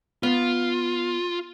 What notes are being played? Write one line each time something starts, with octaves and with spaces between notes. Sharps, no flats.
B3 F4